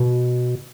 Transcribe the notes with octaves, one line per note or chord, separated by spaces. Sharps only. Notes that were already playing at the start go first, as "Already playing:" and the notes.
Already playing: B2